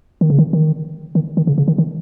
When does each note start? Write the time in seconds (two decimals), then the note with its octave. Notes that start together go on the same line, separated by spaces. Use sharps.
0.21 D#3
0.30 C#3
0.39 D#3
0.53 D#3
1.15 D#3
1.37 D#3
1.47 C#3
1.58 C#3
1.68 D#3
1.78 D#3